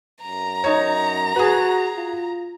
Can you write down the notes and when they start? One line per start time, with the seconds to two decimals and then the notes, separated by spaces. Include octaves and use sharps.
0.22 F#2 A#5
0.64 D#4 C#5
1.36 F#4 G#4 B4
1.97 F4